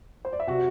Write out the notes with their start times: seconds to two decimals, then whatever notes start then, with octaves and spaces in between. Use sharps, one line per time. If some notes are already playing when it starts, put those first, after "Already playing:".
0.25 C5
0.33 D5
0.40 E5
0.47 C3 F#4 F#5